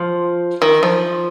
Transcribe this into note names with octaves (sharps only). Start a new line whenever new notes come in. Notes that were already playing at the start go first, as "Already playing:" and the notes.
Already playing: F3
D#3
F3